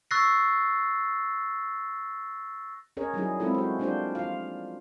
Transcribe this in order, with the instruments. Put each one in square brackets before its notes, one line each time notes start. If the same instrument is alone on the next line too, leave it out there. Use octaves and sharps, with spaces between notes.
[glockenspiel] C#6 E6 F#6 A6 A#6 C7
[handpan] C#4 G#4 A#4 C#5 D#5
F#3 G3 C#4 D#4 E4 G#4
G#3 C4 E4 F4 A4
F#4 C5
G3 A#3 D4 F4 G4 C5
F3 F4 F5